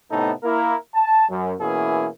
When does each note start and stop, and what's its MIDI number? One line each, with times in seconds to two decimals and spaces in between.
0.11 0.32 45
0.11 0.32 48
0.11 0.32 57
0.11 0.32 59
0.11 0.32 63
0.11 0.32 69
0.44 0.75 58
0.44 0.75 64
0.44 0.75 70
0.94 1.25 81
1.30 1.53 42
1.60 2.07 47
1.60 2.07 52
1.60 2.07 58
1.60 2.07 61
1.60 2.07 64
1.60 2.07 68